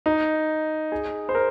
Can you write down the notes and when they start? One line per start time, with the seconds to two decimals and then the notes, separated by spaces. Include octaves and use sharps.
0.06 D#4
0.92 G#4
1.29 C5
1.35 A#4